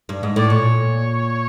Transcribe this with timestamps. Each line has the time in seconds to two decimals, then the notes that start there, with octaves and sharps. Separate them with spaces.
0.09 G2
0.23 G#2
0.36 A2 D5
0.49 A#2 C#5